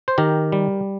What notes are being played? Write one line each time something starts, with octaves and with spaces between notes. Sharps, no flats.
C5
D#3 G4 A#4
G3